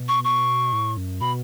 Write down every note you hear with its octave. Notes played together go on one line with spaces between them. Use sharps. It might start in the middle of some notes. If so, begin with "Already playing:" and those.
Already playing: B2
C#6
C#6
A2
F#2
B2 B5